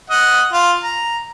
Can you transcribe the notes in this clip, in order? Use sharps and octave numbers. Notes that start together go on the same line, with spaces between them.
D#5 F#5
F4
A#5